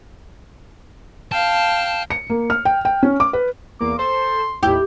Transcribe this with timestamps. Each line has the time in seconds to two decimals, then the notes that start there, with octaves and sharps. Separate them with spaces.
1.32 F5 G5 A5
2.10 C#7
2.30 A#3
2.50 F6
2.65 G5
2.85 G5
3.03 C#4
3.20 D6
3.33 B4
3.81 E2 A#3 D6
3.99 A4 C5 C6
4.63 D#2 A2 E4 G4